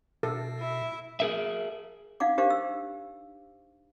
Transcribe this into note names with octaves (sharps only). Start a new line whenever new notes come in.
B2 A4
E4 E5
G#4 A#4 E5
D#4 F5 F#5 D6
D4 G4 A#4 C5 F5 D6
E6